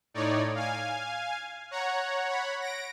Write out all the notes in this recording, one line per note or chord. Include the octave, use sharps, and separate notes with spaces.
A2 D#4 C#5 D5
F5 G#5
C#5 F#5 A#5
C#5 F#5 B5
A#6 D7